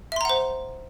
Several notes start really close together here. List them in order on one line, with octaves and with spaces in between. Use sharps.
E5 C6 A#5 F#5 C5